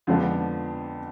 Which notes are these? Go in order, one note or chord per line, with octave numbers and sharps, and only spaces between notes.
F2 D3 F3 G#3 B3